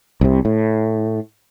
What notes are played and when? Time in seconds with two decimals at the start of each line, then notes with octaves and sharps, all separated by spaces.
0.21 C2 C3
0.45 A2